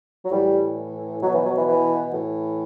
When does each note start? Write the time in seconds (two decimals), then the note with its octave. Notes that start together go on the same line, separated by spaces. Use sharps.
0.25 F#3
0.31 A2 E3 G3
1.22 B2 F#3
1.34 E3
1.45 F#3
1.57 E3
1.68 E3
2.13 A2 E3